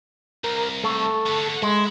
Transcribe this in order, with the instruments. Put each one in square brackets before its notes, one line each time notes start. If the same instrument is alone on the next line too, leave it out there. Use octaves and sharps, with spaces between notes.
[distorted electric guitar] C2 [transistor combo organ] A#4
[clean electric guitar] A3 [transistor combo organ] A4
[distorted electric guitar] D3 B3
[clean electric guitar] G#3 [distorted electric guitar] E4